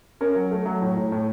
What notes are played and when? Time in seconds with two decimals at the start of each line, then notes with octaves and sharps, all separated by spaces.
0.21 C#4 A#4
0.35 F#3
0.51 A3
0.66 F#3
0.82 A2
0.97 A2
1.12 A2